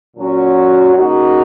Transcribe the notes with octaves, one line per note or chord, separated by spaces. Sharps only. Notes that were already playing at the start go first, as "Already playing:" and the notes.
A#2 F#3 C#4 F#4
C#3 A#3 D#4 F#4